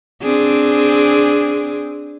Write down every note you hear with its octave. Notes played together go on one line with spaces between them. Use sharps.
C4 D4 G#4